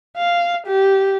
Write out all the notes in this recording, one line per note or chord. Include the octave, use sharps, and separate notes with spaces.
F5
G4